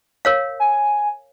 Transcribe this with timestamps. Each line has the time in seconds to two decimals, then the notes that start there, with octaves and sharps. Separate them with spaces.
0.25 A#4 C#5 F5
0.60 G#5